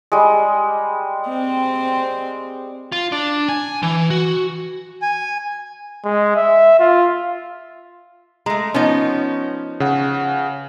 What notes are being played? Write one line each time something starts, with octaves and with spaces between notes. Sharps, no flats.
G3 G#3
C4
F4
D4
G#5
E3
F#4
G#5
G#3
E5
F4
G#3 A3 A#5
F3 B3 C#4 D#4
C#3 F#5